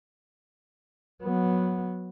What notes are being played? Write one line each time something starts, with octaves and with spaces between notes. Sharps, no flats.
F#3 B3